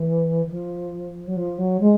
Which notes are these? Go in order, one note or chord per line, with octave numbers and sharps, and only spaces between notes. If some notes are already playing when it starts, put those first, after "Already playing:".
Already playing: E3
E3
F3
F#3
F3
F#3
G#3